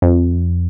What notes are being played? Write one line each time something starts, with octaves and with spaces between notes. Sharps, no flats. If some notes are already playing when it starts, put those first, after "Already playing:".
F2